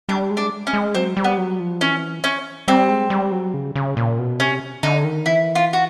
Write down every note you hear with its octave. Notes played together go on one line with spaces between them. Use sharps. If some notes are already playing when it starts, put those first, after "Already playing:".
G3 D4
G#3
D4
C#4
G#3
F#3 C4
G3
B3
F#3
F3
E3 C#4
C#4
G3 C4
G#3
G3
F#3
C#3
C#3
A#2
B2
C3 C#4
D3 D#4
D#3
E3 E4
F4
F#4